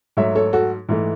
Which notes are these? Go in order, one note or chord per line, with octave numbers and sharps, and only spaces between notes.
G#2 F#3 A3 C#5 E5
A4 C#5
F#4 A4
G#2 E3 A3